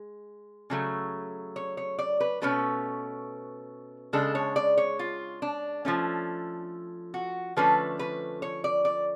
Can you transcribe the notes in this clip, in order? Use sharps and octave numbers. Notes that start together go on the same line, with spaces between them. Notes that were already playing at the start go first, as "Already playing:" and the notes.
Already playing: G#3
C#3 F#3 A3
C#5
C#5
D5
B4
B2 A3 C#4 B4
C#3 G#3 D4 A4
C#5
D5
C#5
F4
D4
F3 A3 C#4
F#4
D3 F3 A3 C#4 B4
B4
C#5
D5
D5